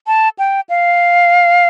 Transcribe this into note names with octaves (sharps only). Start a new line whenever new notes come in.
A5
G5
F5